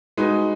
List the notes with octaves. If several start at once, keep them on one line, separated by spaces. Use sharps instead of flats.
G#3 D#4 F#4 B4